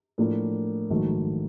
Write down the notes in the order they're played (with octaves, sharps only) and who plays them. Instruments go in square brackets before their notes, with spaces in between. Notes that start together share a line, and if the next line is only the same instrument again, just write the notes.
[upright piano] A2 F3 A#3 D4
A#1 G#2 D#3 F#3 A3